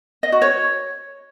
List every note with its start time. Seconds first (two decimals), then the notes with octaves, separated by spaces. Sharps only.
0.23 D#5
0.32 F#4
0.42 C#5